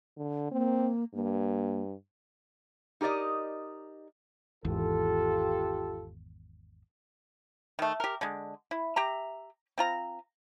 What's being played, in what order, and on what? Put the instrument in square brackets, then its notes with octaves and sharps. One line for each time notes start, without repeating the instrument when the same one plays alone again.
[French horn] D3
[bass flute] A#3 [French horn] C4
[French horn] G2 [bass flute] A#3
[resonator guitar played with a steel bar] D#4 G4 A#4 D5 D#5
[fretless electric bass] G#1 E2 [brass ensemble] F4 G4 A4
[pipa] D#3 A3
G4 A#4
D3 G#3
E4
G4 E5 A#5
C4 F4 A#5